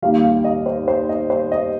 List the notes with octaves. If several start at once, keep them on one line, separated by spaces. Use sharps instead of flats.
D#2 D#3 G3 F5
F5
D#5
C5
C5
D#5
C5
D#5